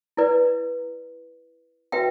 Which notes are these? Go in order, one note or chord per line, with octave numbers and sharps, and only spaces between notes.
E4 B4 D5
F#4 B4 E5 G5